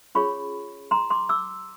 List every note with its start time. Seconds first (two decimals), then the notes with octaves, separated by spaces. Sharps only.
0.15 C#4 F4 G#4 C#5 B5 C#6
0.91 A#5 C6
1.10 C6 D6
1.29 D6 E6